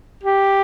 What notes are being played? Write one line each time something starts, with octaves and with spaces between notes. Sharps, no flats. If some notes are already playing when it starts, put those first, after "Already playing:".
G4